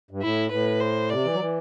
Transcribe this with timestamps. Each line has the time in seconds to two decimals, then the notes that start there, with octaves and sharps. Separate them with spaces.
0.11 G2
0.22 A2 E4
0.52 A2 B4
0.80 C5
1.10 C3 D5
1.24 E3
1.34 F#3
1.40 E3